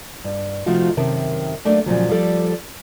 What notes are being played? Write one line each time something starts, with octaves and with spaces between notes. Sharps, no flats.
G2
C3 F3 A3 D#4 F4 F#4
F#2 C3 D#3 A#4 A5
F#3 A3 A#3 D4
A#2 C#3 F3 F#3
F3 G3 A4 D5